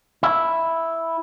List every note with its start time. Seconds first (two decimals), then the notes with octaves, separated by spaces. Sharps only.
0.23 E4